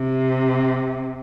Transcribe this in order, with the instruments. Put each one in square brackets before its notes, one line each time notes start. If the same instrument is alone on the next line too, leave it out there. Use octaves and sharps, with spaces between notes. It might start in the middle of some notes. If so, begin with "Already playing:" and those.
Already playing: [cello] C3